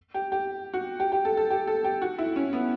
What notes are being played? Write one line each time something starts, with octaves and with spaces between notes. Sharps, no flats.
G4
G4
F#4
G4
G4
A4
A4
G4
A4
G4
F#4
E4
C#4
B3